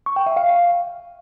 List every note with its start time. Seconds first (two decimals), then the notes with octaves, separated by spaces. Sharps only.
0.06 C#6
0.16 G5
0.26 E5
0.37 F5